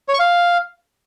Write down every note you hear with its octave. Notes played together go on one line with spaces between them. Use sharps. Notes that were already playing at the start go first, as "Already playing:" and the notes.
C#5
C#6
F5